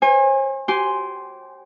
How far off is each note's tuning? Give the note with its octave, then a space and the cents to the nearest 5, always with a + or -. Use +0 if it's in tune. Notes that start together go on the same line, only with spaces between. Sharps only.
C5 +45 G#5 -25
G4 -25 G#5 +0 C6 +0